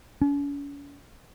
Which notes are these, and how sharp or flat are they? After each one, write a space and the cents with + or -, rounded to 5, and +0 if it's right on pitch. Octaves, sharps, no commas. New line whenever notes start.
C#4 +40